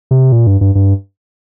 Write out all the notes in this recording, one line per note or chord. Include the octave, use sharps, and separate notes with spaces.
C3
A#2
G2
G2
G2